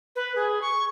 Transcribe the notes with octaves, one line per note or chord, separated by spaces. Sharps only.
B4
G#4
C#6